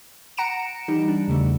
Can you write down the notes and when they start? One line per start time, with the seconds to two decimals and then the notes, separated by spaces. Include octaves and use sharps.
0.37 F#5 A#5 C#7 D7 E7
0.88 E3 G3 D#4
1.08 D4
1.28 E2 C#3 G3 A3